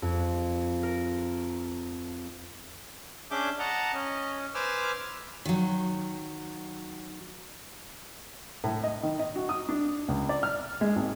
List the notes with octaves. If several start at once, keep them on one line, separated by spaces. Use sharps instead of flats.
F2
A#4
C#4 D4 G#4 E5 D6 G6
D#5 F#5 A5 A#5
C#4 D#5
B4 C5 G#5 D6 E6 F6
D#3 F#3
A2
D#5
D#3
D#5
F#4
D#6
D4
C#2
D5
F6
G#3
G#1